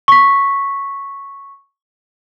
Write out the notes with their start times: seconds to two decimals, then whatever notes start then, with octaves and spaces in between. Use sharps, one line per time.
0.08 C#6 B6